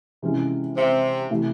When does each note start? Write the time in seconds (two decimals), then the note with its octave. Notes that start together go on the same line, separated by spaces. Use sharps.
0.22 C3 E3 G#3 C#4 F4
0.76 C3
1.30 C3 E3 A3